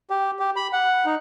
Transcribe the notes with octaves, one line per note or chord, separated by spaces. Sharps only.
G4
G4
B5
F#5
D#4